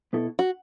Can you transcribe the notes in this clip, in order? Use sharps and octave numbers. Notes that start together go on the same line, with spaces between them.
B2 B3 E4 A4
F#4